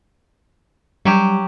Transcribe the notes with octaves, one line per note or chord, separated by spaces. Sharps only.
F#3 G3 G4